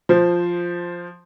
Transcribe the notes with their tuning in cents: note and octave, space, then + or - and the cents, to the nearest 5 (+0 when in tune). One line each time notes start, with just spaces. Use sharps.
F3 +0 C5 +0